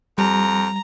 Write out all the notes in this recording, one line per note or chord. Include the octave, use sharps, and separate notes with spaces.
F2 G3 A#5